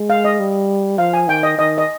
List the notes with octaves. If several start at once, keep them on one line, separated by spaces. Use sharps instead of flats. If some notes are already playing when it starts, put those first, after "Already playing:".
Already playing: G#3
F5
D#5
G3
F3 F5
G#5
D#3 G5
D#5
D#3 D#5
D#5